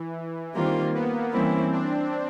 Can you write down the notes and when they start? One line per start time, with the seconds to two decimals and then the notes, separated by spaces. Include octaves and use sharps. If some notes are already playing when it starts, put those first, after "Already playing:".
Already playing: E3
0.55 D#3 G3 A#3 C4 F4
0.94 B3
1.33 E3 G3 A#3 C4 C#4 E4
1.72 D4